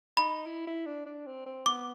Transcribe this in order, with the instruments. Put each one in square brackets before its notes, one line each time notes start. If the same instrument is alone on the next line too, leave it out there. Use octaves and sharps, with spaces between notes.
[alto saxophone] D#4 [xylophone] B5
[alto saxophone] E4
E4
D4
D4
C4
C4
[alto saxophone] B3 [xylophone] D6